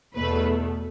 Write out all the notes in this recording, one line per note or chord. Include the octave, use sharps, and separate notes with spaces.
E2 B2 A3 B4